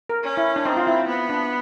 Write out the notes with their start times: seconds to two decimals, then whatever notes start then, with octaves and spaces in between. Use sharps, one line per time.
0.09 A#4
0.23 C#4
0.37 E4
0.56 D4
0.65 C4 D#4
0.77 F4
0.87 E4
1.08 B3
1.29 D4